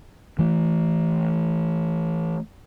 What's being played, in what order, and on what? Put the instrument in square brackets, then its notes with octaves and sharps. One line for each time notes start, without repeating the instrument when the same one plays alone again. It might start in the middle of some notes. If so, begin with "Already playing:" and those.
[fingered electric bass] E3 A3